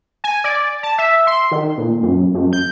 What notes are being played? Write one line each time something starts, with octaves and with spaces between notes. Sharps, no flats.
G#5
D5
A5
E5
C6
D#3
A#2
F#2
F#2
G6